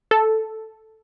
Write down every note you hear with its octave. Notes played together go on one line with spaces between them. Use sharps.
A4